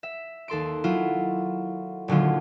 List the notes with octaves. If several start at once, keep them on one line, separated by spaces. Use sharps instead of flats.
E5
D#2 A4 C6 D7
F#3 E4 F4
D#1 D3 F#3 F4